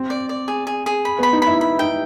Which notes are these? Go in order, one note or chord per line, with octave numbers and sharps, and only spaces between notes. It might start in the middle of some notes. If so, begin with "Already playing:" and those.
Already playing: C4
D5
D5
G#4
G#4
G#4
B5
B3
B5
D#4
E4 B5
B5
D#4 G5